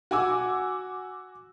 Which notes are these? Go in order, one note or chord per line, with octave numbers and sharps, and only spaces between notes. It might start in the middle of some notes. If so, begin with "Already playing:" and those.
F#4 G#5 D6 E6